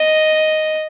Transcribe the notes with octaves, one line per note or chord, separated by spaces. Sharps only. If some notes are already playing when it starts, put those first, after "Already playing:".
Already playing: D#5